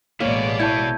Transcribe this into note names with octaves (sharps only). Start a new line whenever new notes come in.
A1 B2 G#3 A#3 B3 C#5 D5
E4 A5 C#6 G6 G#6